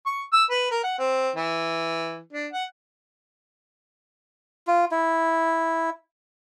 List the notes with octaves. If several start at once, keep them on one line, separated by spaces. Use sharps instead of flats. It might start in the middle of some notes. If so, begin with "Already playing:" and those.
C#6
E6
B4
A#4
F#5
C4
E3
D4
F#5
F4
E4